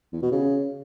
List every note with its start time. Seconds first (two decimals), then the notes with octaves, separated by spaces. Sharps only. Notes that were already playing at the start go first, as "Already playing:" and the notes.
0.13 E2
0.23 B2
0.32 C#3